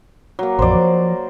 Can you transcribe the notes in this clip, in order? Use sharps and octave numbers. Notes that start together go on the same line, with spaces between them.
F#3 A#3
A1 F2 C5 D5
F3